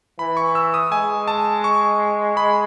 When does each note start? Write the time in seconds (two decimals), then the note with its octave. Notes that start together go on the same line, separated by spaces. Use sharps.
0.19 E3 B5
0.37 C#6
0.55 E6
0.74 D#6
0.92 G#3 G#5
1.28 A5
1.64 C#6
2.37 B5